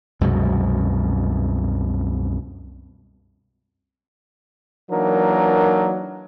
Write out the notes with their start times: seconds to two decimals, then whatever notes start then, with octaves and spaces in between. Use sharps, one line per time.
0.21 C2 F#2 B2 G#3
4.91 E3 F#3 A#3 D4 D#4 A#4